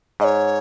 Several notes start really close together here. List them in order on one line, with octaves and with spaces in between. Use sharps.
G#2 D#5 C#5